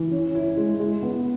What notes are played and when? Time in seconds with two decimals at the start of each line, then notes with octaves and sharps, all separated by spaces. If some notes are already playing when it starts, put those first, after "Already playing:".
Already playing: E3
0.11 C#4
0.35 E4
0.57 G#3
0.80 G#3
1.03 B3